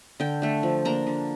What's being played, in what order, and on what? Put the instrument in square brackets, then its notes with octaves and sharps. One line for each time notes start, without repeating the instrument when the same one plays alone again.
[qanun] D3 G5
A3 D4
F3
A#3 D4 A#5
D3